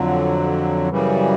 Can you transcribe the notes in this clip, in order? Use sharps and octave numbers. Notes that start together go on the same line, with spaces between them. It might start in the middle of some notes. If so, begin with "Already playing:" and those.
Already playing: F2 D3 F#3
F#2 C#3 E3 G3